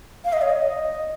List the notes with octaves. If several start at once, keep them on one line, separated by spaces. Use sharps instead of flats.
F5
D#5
C#5
D#5